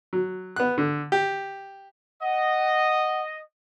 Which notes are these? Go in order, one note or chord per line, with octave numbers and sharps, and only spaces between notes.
F#3
B3 F#6
D3
G4
D#5 F#5